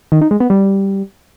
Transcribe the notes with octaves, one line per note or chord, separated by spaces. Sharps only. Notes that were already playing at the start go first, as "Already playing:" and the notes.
D#3
D#4
G#3
B3
G3